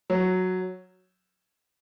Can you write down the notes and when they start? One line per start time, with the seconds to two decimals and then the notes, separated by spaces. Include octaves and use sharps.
0.10 F#3